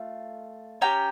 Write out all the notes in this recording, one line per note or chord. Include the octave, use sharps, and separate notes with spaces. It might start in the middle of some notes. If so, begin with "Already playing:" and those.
Already playing: A3 F4
C#4 G4 G5 A#5